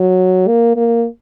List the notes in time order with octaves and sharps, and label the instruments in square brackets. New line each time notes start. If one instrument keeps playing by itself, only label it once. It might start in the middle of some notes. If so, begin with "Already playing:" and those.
Already playing: [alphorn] F#3
A#3
A#3